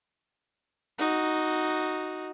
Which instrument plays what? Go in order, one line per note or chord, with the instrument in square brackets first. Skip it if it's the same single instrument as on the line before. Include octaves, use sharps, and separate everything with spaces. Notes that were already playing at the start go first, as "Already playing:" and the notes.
[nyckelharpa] D#4 F#4